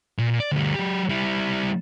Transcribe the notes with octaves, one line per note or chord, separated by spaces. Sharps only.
A#2
D5
D2 G3
F#3 G4
G3 E4